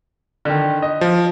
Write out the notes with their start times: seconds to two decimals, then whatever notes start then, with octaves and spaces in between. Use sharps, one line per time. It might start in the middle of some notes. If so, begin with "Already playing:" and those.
0.45 D3 D#3
0.82 D#5
1.01 F3